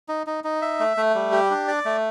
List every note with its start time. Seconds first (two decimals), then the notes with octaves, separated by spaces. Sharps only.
0.08 D#4
0.27 D#4
0.44 D#4
0.62 E5
0.80 A3
0.97 A3
1.15 G3
1.32 G4
1.50 D4
1.68 D5
1.85 A3